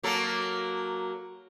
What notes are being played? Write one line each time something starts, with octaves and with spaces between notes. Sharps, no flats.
F#3 A#3 A4